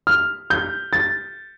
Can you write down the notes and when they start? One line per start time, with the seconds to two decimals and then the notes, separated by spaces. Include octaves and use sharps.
0.07 F6
0.50 G6
0.93 A6